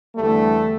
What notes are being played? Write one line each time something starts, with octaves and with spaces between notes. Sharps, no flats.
E2 D3 G3 A3